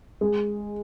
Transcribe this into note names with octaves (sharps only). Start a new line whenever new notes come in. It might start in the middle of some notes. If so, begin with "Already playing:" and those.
G#3